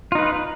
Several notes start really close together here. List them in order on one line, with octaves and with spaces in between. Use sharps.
F4 D#4 B4